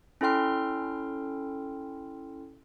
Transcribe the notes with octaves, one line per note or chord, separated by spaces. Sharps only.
C#4 E4 A4 G5 C6 F6